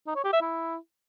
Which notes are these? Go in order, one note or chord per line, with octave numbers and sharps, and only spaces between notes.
D#4
C#5
G4
E5
E4